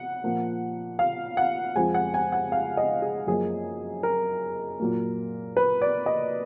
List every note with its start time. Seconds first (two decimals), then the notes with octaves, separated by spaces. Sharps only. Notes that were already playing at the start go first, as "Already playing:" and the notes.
Already playing: F#5
0.24 A#2 F3 A#3
0.99 F5
1.37 F#5
1.76 F2 F3 G#3 G#5
1.94 F#5
2.14 G#5
2.32 F#5
2.52 F5
2.77 D#5
3.02 G#4
3.27 F#2 F3 A#3 G#4
4.03 A#4
4.80 A#2 F#3 A#3
5.57 B4
5.82 D5
6.06 D#5